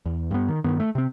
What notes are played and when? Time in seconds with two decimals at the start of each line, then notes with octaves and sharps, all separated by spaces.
0.06 E2
0.31 G2 B3
0.48 D#3
0.64 G2 D#3 B3
0.80 A3
0.95 C3 C4